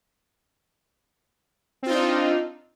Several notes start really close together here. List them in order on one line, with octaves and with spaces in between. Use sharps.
C4 F4 D#4 D4